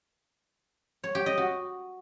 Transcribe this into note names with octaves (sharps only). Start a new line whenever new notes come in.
C#5
G4
D#5
F#4